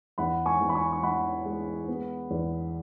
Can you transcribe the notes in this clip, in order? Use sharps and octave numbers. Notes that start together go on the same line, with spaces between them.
E2 F#5 B5
G#5 C#6
E2
B5
G#5 C#6
C#6
E3 F#5 B5
G#3
B3
E2